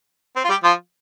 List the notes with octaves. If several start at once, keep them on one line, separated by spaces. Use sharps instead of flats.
C4
F4
G3 G4
F3 F4